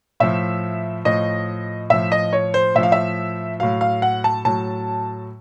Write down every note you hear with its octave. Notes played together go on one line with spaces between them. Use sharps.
A2 F3 E5
A2 F3 D#5
A2 F3 E5
D#5
C#5
C5
A2 F3 E5
F5
E5
A2 F#3 F5
F5
F#5
A5
A2 F#3 A5